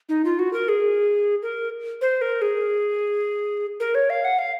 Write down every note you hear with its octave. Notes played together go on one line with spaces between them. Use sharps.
D#4
F4
F#4
A#4
G#4
A#4
C5
A#4
G#4
A#4
C#5
F5
F#5
F5